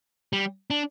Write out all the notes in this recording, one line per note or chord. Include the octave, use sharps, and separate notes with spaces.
G3
D4